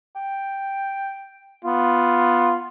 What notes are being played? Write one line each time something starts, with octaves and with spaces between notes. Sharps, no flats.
G5
B3 F4